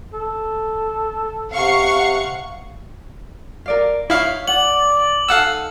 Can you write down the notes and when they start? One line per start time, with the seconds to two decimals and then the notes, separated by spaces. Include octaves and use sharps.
0.13 A4
1.52 C3 F5 F#5 C#6
3.66 A#4 D5 F5
4.10 D#4 E4 C#5 F5
4.48 D5 F#5 F#7
5.29 D#4 A4 F5 F#5 G#5 E6